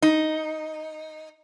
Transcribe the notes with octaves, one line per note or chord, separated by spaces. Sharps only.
D#4